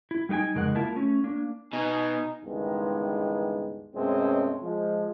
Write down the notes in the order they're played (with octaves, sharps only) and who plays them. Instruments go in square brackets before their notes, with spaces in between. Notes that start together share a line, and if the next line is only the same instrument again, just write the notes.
[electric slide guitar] E4
G3 A3 D#4 G5 G#5
F2 C#3 G#3 A#4 D#5 F#5
A#3 E4 F4 A#4 E5 A5
A3 C#4
A#3 D4
[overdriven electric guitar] B2 [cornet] D#4 [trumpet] G#5
[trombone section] C#2 G2 D#3 E3 G#3 B3
F#2 B2 G#3 A3 C4 C#4
F3 G#3